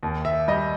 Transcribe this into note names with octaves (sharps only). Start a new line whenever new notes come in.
D#2
E5
G3 D#5